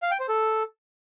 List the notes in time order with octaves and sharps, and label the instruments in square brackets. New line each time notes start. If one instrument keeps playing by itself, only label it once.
[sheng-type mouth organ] F5
G5
C5
A4